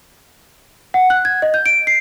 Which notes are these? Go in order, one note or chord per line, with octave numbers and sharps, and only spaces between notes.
F#5
F#6
G#6
D#5
G6
D7
C7